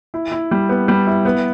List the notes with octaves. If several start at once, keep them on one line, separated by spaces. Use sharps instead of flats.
E4
E4
G3
B3
G3
E4
B3